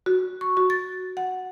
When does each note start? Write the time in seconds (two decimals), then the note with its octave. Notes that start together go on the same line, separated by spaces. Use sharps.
0.06 F#4
0.41 C#6
0.57 F#4
0.70 A6
1.17 F#5